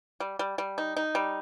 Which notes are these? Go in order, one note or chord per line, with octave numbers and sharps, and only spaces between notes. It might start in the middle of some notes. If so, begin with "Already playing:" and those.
G3
G3
G3
D#4
D#4
G3